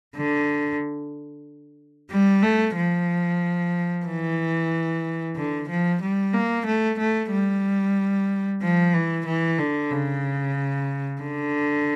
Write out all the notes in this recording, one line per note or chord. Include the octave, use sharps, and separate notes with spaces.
D3
G3
A3
F3
E3
D3
F3
G3
A#3
A3
A3
G3
F3
E3
E3
D3
C#3
D3